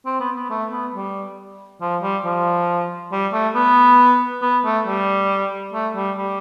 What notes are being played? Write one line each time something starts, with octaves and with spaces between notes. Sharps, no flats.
C4
B3
B3
A3
B3
G3
F3
G3
F3
G3
A3
B3
B3
A3
G3
A3
G3
G3